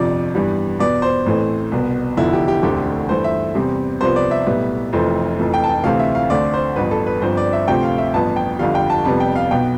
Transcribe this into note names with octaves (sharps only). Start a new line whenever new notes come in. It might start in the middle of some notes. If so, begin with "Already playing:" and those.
Already playing: G1 F2 C3 F3 D5
G2 E3 G3 B3
E2 B2 B3 D5
C5
A1 A2 E3 A3 C4
C2 B2 B3
F1 E2 D3 F3 E4
G4
G4
E1 D2 D3 A3 C4 G4
G2 E3 A3 C5
E5
E2 C3 G3 C4
C2 C3 F3 B3 C5
D5
E5
B1 A2 G3 B3
F1 F2 E3 A3 C4
F1 F2 E3 A3
G5
A5
G5
D2 C3 E3 A3 C4 F5
E5
F5
D2 D3 A3 C4 D5
C5
A1 G2 F3 B3 B4
A4
B4
G1 G2 F3 C4 C5
D5
E5
D2 C3 F3 A3 C4 G5
F5
E5
A1 G2 F3 B3 A5
G5
G1 F2 D3 G3 F5
G5
A5
F2 C3 G3 B3 A5
G5
F5
B1 B2 B3 G5